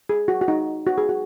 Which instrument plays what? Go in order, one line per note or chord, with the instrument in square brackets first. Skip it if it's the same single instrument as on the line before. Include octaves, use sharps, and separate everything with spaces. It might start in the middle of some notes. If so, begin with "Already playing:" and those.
[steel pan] G#4
F#4
F#4
D#4
F#4
G#4
F#4